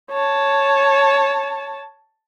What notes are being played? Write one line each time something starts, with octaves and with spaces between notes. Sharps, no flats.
C#5 A5